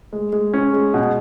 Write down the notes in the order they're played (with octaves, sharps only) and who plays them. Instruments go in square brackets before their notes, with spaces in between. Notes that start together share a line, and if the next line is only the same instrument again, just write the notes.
[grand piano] G#3
G#3
C#4
G#3
B2